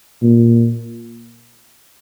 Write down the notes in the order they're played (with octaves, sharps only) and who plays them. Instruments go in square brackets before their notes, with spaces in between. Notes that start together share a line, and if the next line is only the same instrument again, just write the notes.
[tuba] A#2